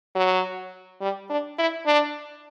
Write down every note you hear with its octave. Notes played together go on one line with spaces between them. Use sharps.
F#3
G3
D4
E4
D4